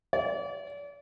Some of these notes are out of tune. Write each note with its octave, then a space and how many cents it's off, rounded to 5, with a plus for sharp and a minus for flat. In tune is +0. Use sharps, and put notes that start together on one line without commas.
D5 -40